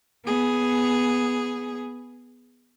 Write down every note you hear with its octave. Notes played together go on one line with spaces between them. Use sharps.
B3 G#4